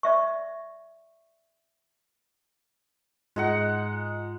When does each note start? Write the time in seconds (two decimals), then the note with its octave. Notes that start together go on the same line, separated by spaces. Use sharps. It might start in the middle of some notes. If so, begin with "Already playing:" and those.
0.03 D5 E5 C#6
3.36 G#2 G#3 D#4 F4 F#5